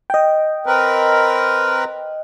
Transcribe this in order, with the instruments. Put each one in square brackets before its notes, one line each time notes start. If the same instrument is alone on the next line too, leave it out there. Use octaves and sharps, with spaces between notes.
[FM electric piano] D#5 G5
[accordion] C4 A#4 B4